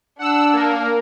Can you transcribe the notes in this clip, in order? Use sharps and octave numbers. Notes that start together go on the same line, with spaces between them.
D4 F#5 E6
A#3 A#4